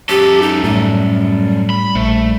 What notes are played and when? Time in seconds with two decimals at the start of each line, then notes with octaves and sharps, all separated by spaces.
0.09 F#2 G4 A4
0.42 D#4
0.64 A2 G3
1.70 B5
1.95 A#1 A3